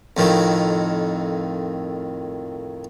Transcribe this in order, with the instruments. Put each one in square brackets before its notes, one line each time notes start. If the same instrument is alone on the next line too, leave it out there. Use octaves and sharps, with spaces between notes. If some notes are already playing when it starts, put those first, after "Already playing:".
[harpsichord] F2 A2 D#3